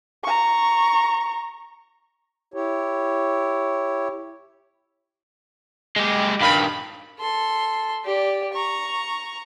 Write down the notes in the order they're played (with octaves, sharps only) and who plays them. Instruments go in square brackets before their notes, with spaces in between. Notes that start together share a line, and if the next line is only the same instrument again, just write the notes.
[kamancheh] A#5 C#6
[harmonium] E4 G4 C#5
[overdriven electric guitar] G#3 G4
[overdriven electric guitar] G2 D#3 [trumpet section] F5 B5
[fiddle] A4 C6
G4 D5
A#5 C#6